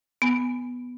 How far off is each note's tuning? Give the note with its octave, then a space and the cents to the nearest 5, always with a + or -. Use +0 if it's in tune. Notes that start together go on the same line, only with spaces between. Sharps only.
B3 +0 G#5 +0 B5 +0